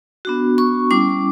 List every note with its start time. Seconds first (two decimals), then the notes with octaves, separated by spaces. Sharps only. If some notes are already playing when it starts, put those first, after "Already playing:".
0.25 B3 D4 F#4
0.58 C#6
0.91 G3 C#4 E4 D6